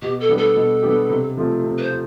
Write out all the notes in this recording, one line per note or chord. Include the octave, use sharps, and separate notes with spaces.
B2 G4
A4
G3 B3 D4 G4
A4
B2
G3 B3 D4 G4
C3
F3 A3 C4 F4
C3
B4
C5
F4